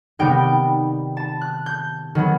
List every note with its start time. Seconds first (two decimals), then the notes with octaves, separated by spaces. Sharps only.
0.19 C3 D#3 G3 B3 D#4 G5
1.17 A5
1.41 F#6
1.66 G6
2.15 D#3 F#3 B3